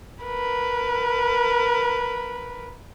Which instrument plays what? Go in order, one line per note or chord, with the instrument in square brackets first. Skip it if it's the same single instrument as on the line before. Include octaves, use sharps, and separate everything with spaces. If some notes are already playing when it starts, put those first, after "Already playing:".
[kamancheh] A#4 B4